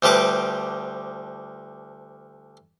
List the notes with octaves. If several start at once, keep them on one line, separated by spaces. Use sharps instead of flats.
D2 F3 G3 B4 D6